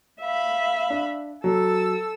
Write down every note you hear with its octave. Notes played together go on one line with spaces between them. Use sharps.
E5 F5 B5
D4
F#3 A4 E6